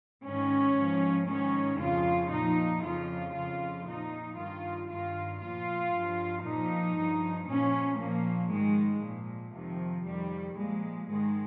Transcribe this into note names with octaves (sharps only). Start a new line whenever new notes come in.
G#2 D#3 C#4
G#2 F3
G#2 D#3 C#4
F2 C#3 F3 F4
A#2 F3 D#4
F2 C#3 F3 F4
F2 C#3 F3 F4
A#2 F3 D#4
G2 D#3 F4
G2 D#3 F4
A#2 F3 F4
G2 F3
A#2 F3 D#4
G2 F3
A#2 F3 C#4
A#2 F3 A#3
G#2 D#3 G#3
A#2 F3
F2 C3 D#3 F3
F2 D#3 G3
A#2 F3 G#3
G#2 D#3 G#3